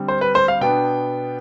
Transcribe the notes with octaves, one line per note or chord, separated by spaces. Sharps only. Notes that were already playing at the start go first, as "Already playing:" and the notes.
Already playing: D3 G3 C4
C5
B4
C5
F5
B2 B3 D4 G5